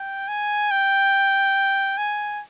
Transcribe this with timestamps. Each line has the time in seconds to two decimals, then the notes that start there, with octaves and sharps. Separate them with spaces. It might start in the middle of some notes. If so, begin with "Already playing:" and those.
Already playing: G5
0.28 G#5
0.71 G5
1.98 G#5